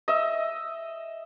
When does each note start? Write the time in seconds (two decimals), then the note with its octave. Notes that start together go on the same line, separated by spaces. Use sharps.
0.08 D#5 E5